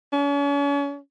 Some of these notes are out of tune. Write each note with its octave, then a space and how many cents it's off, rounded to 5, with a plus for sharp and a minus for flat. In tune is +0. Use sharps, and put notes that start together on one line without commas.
C#4 +40